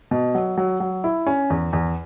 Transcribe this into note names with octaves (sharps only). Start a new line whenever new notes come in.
B2
F#3
F#3
F#3
E4
C#4
E2
E2